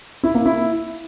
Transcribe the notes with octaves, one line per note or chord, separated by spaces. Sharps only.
E4
A#3
E4